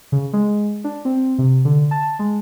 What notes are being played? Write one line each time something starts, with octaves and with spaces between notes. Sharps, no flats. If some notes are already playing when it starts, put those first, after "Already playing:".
C#3
G#3
D4
C4
C3
D3
A5
G#3